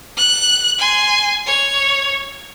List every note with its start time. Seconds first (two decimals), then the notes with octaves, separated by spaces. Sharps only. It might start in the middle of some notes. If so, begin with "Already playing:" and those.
0.17 F#6
0.78 G#5 C6
1.46 C#5